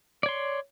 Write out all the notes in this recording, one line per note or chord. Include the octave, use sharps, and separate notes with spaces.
C#5 D5 C6